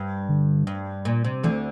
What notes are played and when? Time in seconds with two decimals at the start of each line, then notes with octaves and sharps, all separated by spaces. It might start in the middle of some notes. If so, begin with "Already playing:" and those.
Already playing: G2
0.29 D3
0.67 G2
1.05 A#2
1.24 C3
1.44 D2 D3 E3